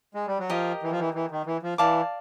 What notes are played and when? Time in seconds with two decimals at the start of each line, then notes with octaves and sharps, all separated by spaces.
0.15 G#3
0.27 G3
0.39 F#3
0.50 F3 G4 A#4 D#5
0.83 E3
0.91 F3
0.99 E3
1.14 E3
1.31 D#3
1.46 E3
1.63 F3
1.78 E3 D5 F5 A5 D6